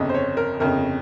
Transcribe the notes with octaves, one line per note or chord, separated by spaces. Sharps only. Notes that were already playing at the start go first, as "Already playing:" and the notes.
Already playing: G1 F2 C#3 D#5
C5
C#5
A#4
G1 F2 C#3 A#4